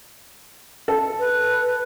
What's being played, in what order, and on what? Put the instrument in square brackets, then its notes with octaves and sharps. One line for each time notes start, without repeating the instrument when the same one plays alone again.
[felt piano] A4
[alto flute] B4